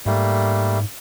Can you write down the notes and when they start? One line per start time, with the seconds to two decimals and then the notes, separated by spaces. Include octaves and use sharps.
0.06 G#2 G3 A3 A#3